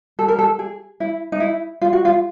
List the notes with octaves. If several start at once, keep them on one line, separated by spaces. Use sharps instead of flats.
A4
A#4
A4
G#4
E4
D#4
E4
F4
F#4
F4